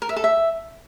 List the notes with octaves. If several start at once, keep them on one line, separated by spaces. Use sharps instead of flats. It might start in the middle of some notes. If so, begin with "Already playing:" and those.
A#4
E5
A4
E5